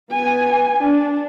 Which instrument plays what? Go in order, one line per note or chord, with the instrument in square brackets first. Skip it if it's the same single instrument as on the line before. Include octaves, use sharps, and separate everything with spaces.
[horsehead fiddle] B3 G#5
D4